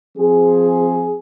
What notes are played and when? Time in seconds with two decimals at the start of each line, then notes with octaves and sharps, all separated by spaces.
0.17 F3 C4 G#4